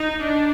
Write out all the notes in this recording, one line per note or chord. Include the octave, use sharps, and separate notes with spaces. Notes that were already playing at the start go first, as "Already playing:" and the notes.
Already playing: D#4
D4